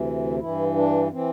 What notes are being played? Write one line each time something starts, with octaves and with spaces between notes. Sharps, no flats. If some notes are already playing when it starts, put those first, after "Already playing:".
Already playing: D2 C3 E3
G2 E3 E4
D4
E3 C4